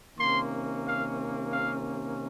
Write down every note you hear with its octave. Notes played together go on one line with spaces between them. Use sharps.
C3 D#3 A#3 C#4 C6
F5
F5